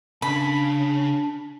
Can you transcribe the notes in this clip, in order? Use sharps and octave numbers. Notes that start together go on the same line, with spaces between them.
C#3 D4 B5